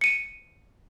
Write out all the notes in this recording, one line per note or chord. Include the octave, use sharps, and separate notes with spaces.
C#7 D#7